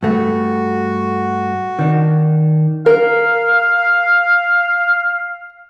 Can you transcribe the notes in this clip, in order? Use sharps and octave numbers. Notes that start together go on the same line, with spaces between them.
G2 A3 F#4
D#3 D4
A#4 F5